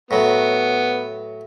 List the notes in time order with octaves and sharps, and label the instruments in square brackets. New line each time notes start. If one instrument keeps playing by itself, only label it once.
[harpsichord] A2 F#3 [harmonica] B3